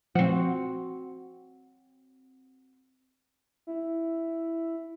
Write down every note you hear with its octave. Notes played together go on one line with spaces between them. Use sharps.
F3 C4 F#4
E4